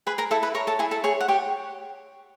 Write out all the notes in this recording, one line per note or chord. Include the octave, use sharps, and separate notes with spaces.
G#4 B4 B5
A#4 A#5
E4 A4 A5
B4 B5
A#4 C#5 A#5
A4 A5
E4 G#4 G#5
A4 A5
G#4 C#5 G#5
F#5
G4 C#5 G5